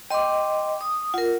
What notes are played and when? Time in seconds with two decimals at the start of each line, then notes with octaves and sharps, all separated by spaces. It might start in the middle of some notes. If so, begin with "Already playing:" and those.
0.10 D#5 G5 C6 D6
0.81 D#6
1.14 F4 A#4 F#5